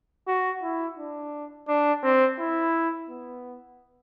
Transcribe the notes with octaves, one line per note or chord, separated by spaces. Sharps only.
F#4
E4
D4
D4
C4
E4
B3